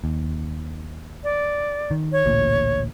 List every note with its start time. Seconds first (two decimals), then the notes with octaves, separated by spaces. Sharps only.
0.04 D#2
1.24 D5
1.91 D#3
2.12 C#5
2.26 A1 D2 A#2